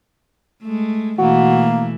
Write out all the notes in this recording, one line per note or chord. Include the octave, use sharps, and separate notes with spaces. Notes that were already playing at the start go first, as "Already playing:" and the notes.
G#3 A3
B2 E3 A3 A#3 F#4